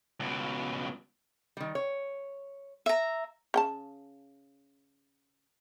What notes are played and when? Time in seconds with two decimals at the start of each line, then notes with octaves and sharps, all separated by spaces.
0.20 C#2 B2
1.57 D#3 G3
1.75 C#5
2.86 E5 A#5
3.54 C#3 G5 A5